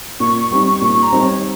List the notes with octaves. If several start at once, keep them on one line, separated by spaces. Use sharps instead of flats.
A#2 C#6
G3 C4 D#4 C#6
C#6
A#2 C#6
A#5
G3 C4 D#4
C#5